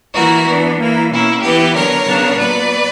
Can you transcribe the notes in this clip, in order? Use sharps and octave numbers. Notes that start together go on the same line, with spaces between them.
E3 A#3 E4 F#4 A#4
E3 B3 D4
E3 A#3 E4
B2 A#3 C#4 E4
E3 B3 E4 G4 B4
D3 F#3 B3 A#4 C#5
C#3 F#3 B3 D4
A#2 F#3 B3 B4 D5